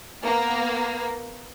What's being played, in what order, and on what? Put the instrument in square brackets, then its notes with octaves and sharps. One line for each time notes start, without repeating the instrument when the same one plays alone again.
[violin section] A#3 B3